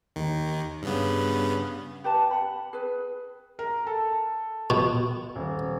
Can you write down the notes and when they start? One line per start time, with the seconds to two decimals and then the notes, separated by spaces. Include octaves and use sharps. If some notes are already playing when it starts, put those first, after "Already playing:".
0.16 D#2 D#3
0.83 G2 C#3 B3
2.04 G4 B4 A5
2.31 F#5 B5
2.73 G#4 B4
3.59 A#4
3.87 A4
4.70 B2
5.36 D#1